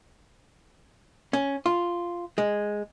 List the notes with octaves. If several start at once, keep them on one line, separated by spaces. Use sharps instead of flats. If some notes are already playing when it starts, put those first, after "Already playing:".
C#4
F4
G#3